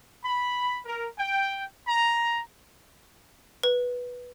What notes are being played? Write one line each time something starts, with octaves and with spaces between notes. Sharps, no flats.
B5
A#4
G5
A#5
B4